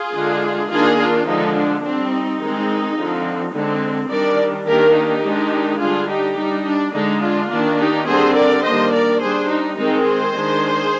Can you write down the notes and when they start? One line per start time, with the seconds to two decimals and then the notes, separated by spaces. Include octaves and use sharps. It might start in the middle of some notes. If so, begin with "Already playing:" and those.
Already playing: F4 G#4
0.13 D3 G#3 D4
0.69 D#3 A#3 D4 F4 G#4
0.98 D4 F4
1.26 D3 F3 G#3 D#4
1.55 D4
1.83 G3 C4 D4
2.12 D#4
2.40 D#3 G#3 C4
2.97 D3 F3 C4
3.53 D3 G#3 C4
4.10 D#3 G3 D4 A#4 D5
4.67 D#3 A#3 D4 G4 A#4
4.95 D#4 G4
5.24 D#3 G#3 D4
5.80 D3 G3 D4 F4 G#4
6.09 D#4 G4
6.37 G3 D4 D#4
6.66 D4
6.94 D3 G#3 D4 D#4
7.22 D4 F4
7.50 D#3 A#3 D4
7.78 D#4 G4
8.07 D3 G3 C4 G#4 C5
8.35 A#4 D5
8.64 D#3 G3 A#3 D4 C5 D#5
8.92 A#4 D5
9.21 G3 D4 G#4 C5
9.49 D#4
9.78 D#3 G#3 C4 D#4
10.05 G#4 C5
10.34 D#3 G#3 D4